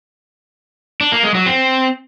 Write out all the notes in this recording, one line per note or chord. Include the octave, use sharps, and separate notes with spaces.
D4
A#3
G#3
F#3
C4